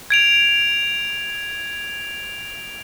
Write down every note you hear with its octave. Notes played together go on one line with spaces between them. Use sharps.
G#6 D7 F7